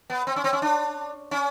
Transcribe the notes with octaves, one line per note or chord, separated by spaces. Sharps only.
B3
C4
C#4
C4
C#4
D4
C#4